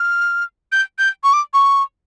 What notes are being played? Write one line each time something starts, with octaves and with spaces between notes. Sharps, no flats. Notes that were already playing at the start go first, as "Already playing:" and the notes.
Already playing: F6
G6
G6
C#6
D6
C#6